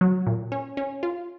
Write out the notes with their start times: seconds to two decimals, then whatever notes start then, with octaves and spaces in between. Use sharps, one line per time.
0.01 F#3
0.26 A#2
0.52 C#4
0.77 C#4
1.03 F4